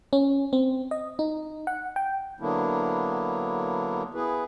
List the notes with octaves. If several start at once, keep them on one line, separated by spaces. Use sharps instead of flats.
C#4
C4
D#5
D#4
F#5
G5
D3 F#3 A#3 B3 D4 E4
B3 E4 G#4 B4